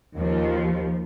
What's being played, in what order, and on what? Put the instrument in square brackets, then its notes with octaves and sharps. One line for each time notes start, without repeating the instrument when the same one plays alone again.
[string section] D#2 F3